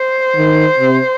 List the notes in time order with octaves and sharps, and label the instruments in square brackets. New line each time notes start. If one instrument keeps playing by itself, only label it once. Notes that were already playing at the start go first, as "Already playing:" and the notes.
Already playing: [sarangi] C5
[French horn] D#3
C3